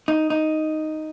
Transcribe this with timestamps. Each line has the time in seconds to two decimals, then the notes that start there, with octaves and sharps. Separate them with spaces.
0.08 D#4
0.30 D#4